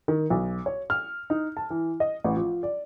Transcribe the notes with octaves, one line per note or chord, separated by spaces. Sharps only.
D#3
B1
C#5
F6
D#4
A5
E3
D#5
A1
F3
D5